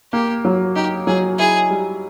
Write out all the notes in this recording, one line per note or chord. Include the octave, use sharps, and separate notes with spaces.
A#3 G4
F#3
D#4 G4
F#3 G#4
E4 G#4
G3